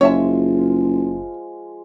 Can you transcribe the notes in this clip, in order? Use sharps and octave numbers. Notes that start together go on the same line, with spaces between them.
F#1 F3 G#3 F4 C#5 E5 A5